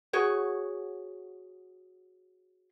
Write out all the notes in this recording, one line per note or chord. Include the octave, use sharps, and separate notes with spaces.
F#4 G#4 C#5